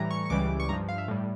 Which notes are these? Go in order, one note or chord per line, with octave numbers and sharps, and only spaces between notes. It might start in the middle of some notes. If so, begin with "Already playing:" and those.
Already playing: A2 E3 G3 A#5
C#6
C#6
C#2 C#3 E3 G3 D6
C#6
G2 F3 A#5
F5
E5
A2 G3